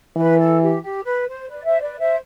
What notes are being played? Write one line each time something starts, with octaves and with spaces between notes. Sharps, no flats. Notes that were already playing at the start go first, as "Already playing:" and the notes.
E3 B4
A4
G4
G4
B4
C5
B4 D5
C5 E5
B4 D5
C5 E5